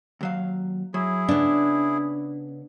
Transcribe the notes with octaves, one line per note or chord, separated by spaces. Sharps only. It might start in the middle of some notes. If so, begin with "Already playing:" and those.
D#2 F#3 F5
F#3 E4 G#4
C#3 B3 D4